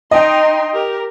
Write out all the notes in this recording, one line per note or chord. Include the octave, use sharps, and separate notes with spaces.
D#4 D#5 G5 C6
G4 A#4